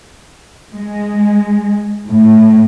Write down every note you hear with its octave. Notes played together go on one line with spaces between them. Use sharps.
G#3
A2